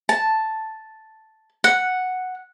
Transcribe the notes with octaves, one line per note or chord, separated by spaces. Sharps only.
A5
F#5